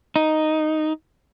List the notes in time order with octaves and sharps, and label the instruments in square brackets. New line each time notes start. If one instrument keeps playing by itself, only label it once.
[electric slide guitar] D#4